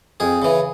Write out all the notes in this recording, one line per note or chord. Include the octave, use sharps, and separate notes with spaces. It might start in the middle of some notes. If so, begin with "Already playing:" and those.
F2 G#4
C#3 E3